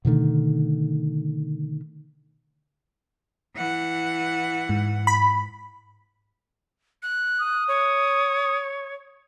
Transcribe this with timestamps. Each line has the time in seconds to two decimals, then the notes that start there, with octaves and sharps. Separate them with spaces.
0.05 B2 D3 D#3 A3
3.56 E3 F#5
4.69 G#2
5.07 B5
7.03 F#6
7.39 D#6
7.68 C#5